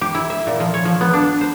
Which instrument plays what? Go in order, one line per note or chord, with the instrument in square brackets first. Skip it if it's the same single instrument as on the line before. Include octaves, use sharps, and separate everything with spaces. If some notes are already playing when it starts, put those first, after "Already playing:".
[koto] G4
E4
E5
A#2
F3
C#5
F3
B3
D4
C5